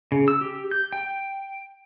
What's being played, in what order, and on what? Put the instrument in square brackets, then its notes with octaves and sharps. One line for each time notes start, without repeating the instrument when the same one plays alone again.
[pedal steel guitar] C#3
E6
G4
G6
G5